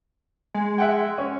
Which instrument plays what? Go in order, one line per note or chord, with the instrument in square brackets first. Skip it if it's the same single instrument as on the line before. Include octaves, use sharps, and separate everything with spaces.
[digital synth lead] G#3
[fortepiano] E5 F#5 G5
C#4